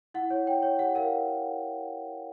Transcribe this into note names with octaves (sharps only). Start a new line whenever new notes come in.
E4 F#5
C#5
C#5 G5
C#5
G4 F#5
A#4 F5